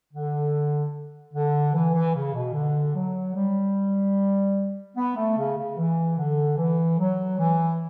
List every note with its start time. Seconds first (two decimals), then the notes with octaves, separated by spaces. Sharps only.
0.12 D3
1.33 D3
1.73 E3
1.94 E3
2.14 C#3
2.33 B2
2.53 D3
2.95 F#3
3.34 G3
4.96 B3
5.16 A3
5.37 C#3
5.57 C#3
5.77 E3
6.18 D3
6.58 E3
6.98 F#3
7.38 E3